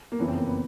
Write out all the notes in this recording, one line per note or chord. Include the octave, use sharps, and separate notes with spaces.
A#3
F#1 F2 C#3 E3 B3
C4
A#3
B3